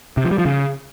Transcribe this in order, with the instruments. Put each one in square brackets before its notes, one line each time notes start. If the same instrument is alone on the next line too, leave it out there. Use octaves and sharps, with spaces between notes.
[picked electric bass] C3
F3
G3
F3
C#3